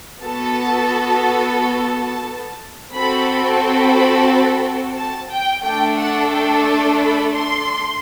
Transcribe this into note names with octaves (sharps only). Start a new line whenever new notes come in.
B3 F#4 A4 A5
A5
C4 F#4 A4 B5
B5
A5
G5
A3 D4 A4 G5
F#5
G5
A5
B5
C6